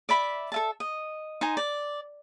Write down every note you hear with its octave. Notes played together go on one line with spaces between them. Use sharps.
D5 E5 B5
A4 E5 A5
D#5
D#4 C5 G#5
D5